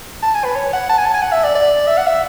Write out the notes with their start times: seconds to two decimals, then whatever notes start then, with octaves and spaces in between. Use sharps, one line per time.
0.23 A5
0.35 G#5
0.45 B4
0.56 C#5
0.73 F#5
0.90 A5
0.98 G#5
1.06 A5
1.14 G#5
1.22 F#5
1.32 E5
1.44 D5
1.55 D5
1.87 E5
1.98 F#5
2.07 E5